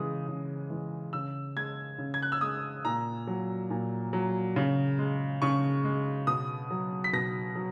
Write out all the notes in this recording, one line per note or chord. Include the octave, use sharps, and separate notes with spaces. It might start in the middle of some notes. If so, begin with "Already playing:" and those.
Already playing: C#3 E3 G#3 D#6
C#3
E3 G#3
C#3 E6
G#3 G#6
C#3
G#6
F#6
E6
G#3 D#6
A#2 A#5
F#3
A#2
F#3
C#3
G#3
C#3 C#6
G#3
B2 D#6
F#3
B6
B2 A#6
F#3